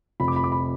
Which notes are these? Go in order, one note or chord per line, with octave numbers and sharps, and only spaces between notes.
F1 B5
D6
B5
D6
B5